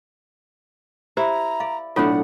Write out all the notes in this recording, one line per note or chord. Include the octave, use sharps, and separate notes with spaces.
E4 G4 C5 A#5
D5 F5
B1 A2 D4 F4 A4 C#5 F#5